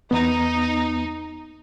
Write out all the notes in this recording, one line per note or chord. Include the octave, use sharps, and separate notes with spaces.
E2 B3 D#4